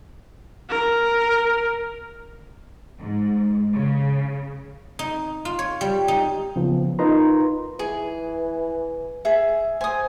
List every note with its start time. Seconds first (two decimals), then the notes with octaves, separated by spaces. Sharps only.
0.69 A#4
2.99 G#2
3.73 C#3
4.99 D#4
5.45 F4
5.59 C#5
5.81 G3
6.08 D#4
6.56 C#3 F3 B3
6.99 D#4 F4 A#4 B4 A#5 C6
7.79 E3 G#4
9.25 G#4 E5
9.81 C5 G#5 D#6